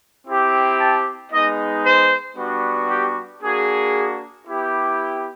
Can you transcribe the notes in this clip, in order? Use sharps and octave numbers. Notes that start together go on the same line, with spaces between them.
C4 E4 G4
A5
G#3 B3 D#4 D#5
C5
G3 B3 D4 F#4
G4
A#3 D4 F#4 G#4
B3 E4 G4